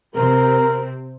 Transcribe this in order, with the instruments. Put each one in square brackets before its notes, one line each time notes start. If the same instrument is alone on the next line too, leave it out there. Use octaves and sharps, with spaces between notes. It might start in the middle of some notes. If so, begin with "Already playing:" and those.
[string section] C3 C4 [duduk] A#4